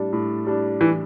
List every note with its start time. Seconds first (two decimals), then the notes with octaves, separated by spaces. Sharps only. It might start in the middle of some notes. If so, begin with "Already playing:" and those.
Already playing: A2 G3 D4
0.13 A2
0.47 G3 D4
0.81 E3